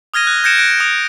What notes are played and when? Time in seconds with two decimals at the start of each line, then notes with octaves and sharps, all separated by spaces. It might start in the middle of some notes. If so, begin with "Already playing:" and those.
0.14 D#6 F6 G#6 A#6 D#7
0.27 F#6
0.44 G6 G#6 A#6 C#7 D7 E7
0.58 F#6 D7
0.80 D#6 D7